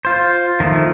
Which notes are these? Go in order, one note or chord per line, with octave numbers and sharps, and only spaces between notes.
F4 C5
D#3 F3 A3